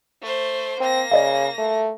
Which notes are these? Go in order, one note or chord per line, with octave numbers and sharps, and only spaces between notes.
A3 C5
A#3 C4 A#6
C#3 D5 D#5 F5
A3